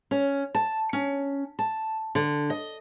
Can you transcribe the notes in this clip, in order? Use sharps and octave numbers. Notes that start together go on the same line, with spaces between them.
C#4
A5
C#4
A5
D3
D#5